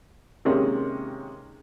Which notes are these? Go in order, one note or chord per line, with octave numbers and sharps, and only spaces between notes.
C3 D#3 G#3 A#3 C#4